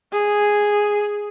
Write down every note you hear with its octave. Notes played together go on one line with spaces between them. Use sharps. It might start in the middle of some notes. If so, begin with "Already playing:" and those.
G#4